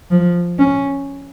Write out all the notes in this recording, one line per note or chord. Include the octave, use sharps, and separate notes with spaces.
F3
C#4